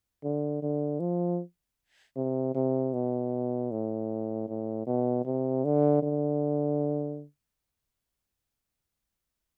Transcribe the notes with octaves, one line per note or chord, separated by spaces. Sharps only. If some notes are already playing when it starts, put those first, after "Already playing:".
D3
D3
F3
C3
C3
B2
A2
A2
B2
C3
D3
D3